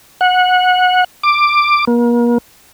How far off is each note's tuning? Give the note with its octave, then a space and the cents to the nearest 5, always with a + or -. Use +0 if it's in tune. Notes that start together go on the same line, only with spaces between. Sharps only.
F#5 -20
D6 +10
A#3 +40